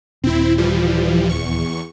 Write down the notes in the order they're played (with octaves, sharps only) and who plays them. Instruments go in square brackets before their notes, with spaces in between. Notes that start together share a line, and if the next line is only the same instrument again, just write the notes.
[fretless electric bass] D#1 [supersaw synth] C4 E4
[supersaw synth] E3 F3 G3
E2 C#6